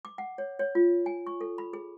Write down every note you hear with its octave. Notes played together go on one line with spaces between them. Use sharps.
D6
F#5
C#5
C#5
F4
G#5
C#6
A4
B5
G#4